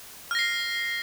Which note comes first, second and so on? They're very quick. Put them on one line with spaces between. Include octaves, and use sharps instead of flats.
F6 A#6 C7